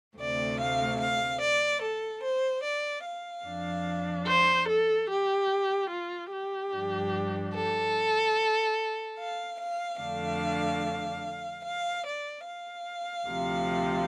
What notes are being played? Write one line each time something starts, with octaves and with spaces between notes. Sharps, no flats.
D2 C3 A3 C4 D5
F5
F5
D5
A4
C5
D5
F5
F2 F3 D4
C5
A4
G4
F4
G4
G2 F3 D4
A4
F5
F5
F2 D3 A3 D4 F5
F5
D5
F5
D2 C3 F3